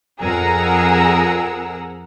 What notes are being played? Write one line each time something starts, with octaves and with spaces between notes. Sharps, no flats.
F2 G#4 A#4 F#5 A#5 E6